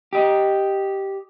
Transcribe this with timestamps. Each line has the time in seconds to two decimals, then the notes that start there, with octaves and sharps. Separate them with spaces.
0.13 G4 D#5